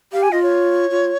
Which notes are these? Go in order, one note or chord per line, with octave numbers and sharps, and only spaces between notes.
G4 F5
G#5
F4 D#5
C#5
F4